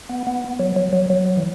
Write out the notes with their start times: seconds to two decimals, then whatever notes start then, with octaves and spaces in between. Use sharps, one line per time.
0.09 B3
0.27 B3
0.60 F#3
0.76 F#3
0.93 F#3
1.10 F#3
1.37 E3